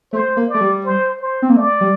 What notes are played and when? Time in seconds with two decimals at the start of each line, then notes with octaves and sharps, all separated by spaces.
0.13 A3 C5
0.37 A#3
0.48 D5
0.54 A3
0.61 G3
0.85 C5
1.21 C5
1.42 C4
1.50 A#3
1.56 A3 D5
1.81 G3